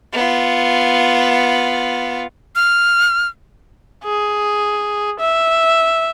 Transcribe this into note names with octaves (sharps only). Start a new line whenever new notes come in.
B3 F4
F6
G#4
E5